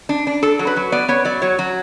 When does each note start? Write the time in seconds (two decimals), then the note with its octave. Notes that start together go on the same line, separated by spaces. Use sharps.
0.09 D4
0.27 D4
0.43 D4 A4
0.59 F#3
0.67 B4
0.76 F#3
0.92 B3 D5
1.08 B3 C#5
1.25 F#3 D5
1.42 F#3 C#5
1.59 F#3